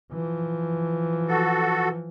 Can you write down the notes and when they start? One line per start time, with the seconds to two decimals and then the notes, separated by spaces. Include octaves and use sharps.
0.12 E3 F3
1.28 F#4 A4